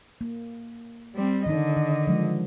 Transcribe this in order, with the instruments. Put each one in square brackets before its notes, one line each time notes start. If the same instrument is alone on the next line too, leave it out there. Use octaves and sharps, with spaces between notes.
[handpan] A#3
[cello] G3 C4
[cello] D3 D#5 [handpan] D#3 D#4
[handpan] D#3
F3 F#3 G#3